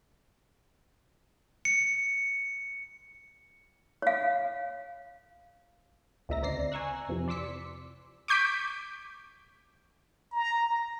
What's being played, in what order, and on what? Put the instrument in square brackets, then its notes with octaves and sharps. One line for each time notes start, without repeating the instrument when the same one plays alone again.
[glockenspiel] C#7
[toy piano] C#5 F5
[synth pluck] C#2 A#2 D#5 E5 A#5 A#6
D2 C4 D5 A#6 C7
G#5 A#5 C#6 E6 F#6
F2 C3 E3 F3
D5 C6 D6 E6 B6 C#7
[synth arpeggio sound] C#6 D6 G6 B6 D7
[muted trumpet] A#5